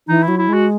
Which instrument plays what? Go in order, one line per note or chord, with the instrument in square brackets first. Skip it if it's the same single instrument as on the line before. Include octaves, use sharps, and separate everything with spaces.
[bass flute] E3 [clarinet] D#4
[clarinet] E4
[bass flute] F#3
[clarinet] E4
[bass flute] G#3 [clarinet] F#4